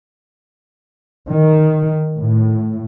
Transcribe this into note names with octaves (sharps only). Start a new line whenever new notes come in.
D#3
A2